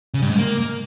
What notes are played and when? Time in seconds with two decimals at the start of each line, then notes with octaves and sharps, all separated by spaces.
0.14 C#3
0.22 G2
0.30 G#2
0.38 A#3